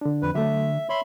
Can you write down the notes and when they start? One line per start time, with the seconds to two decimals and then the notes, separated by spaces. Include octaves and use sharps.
0.01 D3 D4
0.22 F2 B4
0.35 D3 F#3 A3 E5
0.89 C#5 E5 B5 C6